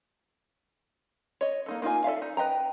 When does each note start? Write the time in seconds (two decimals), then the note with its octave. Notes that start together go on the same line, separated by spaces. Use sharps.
1.41 C#5 D#5
1.66 A#3 D#4 A4
1.82 A#3 D#4 F4 G#5
2.04 A4 D5 E5 F5
2.22 D#4
2.37 B4 D#5 G5 A#5